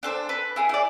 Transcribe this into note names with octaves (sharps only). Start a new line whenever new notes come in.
D4 A4 C5
B4
E4 G#4
E4 D5